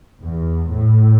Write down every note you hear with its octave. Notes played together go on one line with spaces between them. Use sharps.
E2
A2